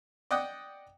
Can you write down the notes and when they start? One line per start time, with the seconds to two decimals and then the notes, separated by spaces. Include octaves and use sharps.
0.31 D5 D#5 F#5 G5 D#6